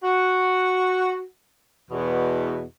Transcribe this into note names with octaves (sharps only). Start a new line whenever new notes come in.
F#4
E2 B2